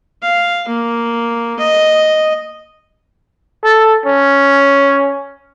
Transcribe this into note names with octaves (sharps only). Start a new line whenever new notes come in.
F5
A#3
D#5
A4
C#4